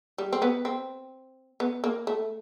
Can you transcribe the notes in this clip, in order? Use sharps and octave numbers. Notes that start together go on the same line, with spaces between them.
G3
C4
B3
C4
B3
A#3
A3